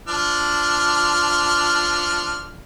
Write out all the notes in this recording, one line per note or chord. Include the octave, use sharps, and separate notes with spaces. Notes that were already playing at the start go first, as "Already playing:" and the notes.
F3 D4 F6